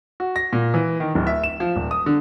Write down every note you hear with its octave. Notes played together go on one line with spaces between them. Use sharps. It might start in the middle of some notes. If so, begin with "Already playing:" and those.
F#4
A#6
A#2
E3
D#3
D1
E5
E7
F3
D#1
D#6
D3